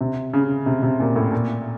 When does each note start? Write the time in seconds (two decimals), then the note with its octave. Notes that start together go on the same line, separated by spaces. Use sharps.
0.01 C3
0.33 C#3
0.66 C3
0.83 C3
1.00 A#2
1.16 A2
1.32 A#2